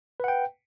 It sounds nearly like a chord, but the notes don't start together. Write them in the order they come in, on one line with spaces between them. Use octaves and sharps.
B4 F#5 G5